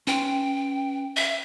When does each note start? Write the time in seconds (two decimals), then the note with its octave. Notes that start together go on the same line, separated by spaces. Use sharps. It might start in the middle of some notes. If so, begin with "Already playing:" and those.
0.07 C#4 B4 G5 C6
1.16 E5